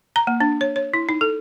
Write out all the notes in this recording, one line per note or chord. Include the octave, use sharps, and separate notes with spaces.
A#5
A#3
D4
C#5
C#5
E4
D#4
A4